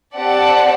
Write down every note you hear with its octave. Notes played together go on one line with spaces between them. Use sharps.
C4 G4 D5 F#5 A5